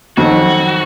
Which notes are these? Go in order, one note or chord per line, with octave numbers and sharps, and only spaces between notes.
F2 D#3 F#3 F#4